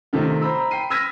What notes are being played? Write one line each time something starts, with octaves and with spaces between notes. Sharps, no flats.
C3 D#3 A3 D#4 F4
C5 A#5 B5 E6
G5 B5 C7 D#7
E6 F6 G#6 A#6 B6 D#7